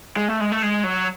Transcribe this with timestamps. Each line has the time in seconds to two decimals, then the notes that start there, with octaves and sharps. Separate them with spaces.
0.17 G#3
0.28 A3
0.40 G#3
0.52 A3
0.63 G#3
0.83 F#3